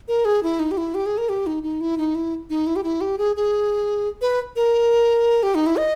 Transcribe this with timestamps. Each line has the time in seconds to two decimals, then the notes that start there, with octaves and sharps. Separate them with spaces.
0.08 A#4
0.25 G#4
0.43 E4
0.60 D#4
0.71 G4
0.77 E4
0.95 G4
1.06 G#4
1.18 A#4
1.29 G4
1.47 D#4
1.63 D#4
1.81 E4
1.98 D#4
2.15 E4
2.50 D#4
2.67 E4
2.76 G4
2.84 E4
3.01 G4
3.18 G#4
3.36 G#4
4.21 B4
4.56 A#4
5.43 G4
5.55 D#4
5.66 E4
5.78 D#5